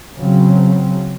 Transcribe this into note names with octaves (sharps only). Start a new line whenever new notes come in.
C#3 F#3 C4